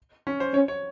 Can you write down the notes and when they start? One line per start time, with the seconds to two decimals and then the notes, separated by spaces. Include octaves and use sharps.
0.27 C#4
0.40 C5
0.54 C#4 C#5
0.68 C#5